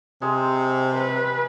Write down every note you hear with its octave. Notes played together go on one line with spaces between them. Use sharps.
C3 G#3 C5
B4